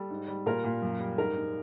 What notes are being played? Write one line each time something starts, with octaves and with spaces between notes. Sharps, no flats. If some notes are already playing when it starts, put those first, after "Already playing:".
Already playing: G3 A4
G#2
G3
A#2 A#4
A#2
F#2
G3
G#2 A#4
G#2